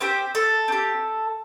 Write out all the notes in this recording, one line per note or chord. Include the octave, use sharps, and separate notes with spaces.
C4 G4 C5
A4
C4 G4